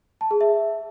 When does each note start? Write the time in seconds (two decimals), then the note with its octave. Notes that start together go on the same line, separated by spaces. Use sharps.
0.21 A5
0.31 G#4
0.41 E5